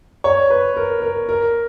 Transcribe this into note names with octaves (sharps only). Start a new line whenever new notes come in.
C#5
B4
A#4
A#4
A#4